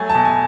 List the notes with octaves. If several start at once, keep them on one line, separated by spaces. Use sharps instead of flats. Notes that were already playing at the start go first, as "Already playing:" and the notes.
Already playing: F#3 A3 G#5
A5
B2
G#5